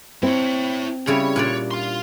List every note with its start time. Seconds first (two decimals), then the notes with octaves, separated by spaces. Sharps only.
0.23 C4 E4 C#5
1.07 C#3 G3 E4 C#5
1.36 A#2 D4 D5
1.71 F5 C6